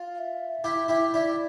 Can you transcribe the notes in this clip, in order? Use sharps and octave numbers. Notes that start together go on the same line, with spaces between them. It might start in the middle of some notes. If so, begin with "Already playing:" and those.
Already playing: F4
F5
E5
E4 G4
E4 G4
E4 G4 D5